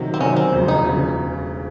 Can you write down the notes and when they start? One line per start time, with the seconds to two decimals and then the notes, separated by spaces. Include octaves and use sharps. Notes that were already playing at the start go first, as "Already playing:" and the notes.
Already playing: C3 D#3 F#3
0.14 C4
0.21 C3 D#3 F#3 C#4
0.36 C4
0.52 E1 D2 C#3 F3
0.68 D#4
0.85 E1 D2 C#3 F3